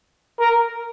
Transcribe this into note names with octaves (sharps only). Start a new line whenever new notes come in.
A#4